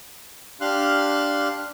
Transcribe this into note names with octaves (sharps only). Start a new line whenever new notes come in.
D4 G4 F5 C6 F6 F#6